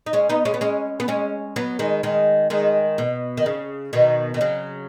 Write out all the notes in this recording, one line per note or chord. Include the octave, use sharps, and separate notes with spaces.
D#4
G#3 C#4
B3 D#4
G#3 C#4
B3
G#3 C#4
B3
G#3 C#4
F#3 B3
D#3 G#3
D#3 G#3
D#3 G#3
B2
D#3
C#3
B2 D#3
D#3
C#3 F#3